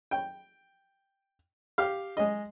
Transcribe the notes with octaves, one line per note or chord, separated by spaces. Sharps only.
G5
G4 F5
G#3 D#5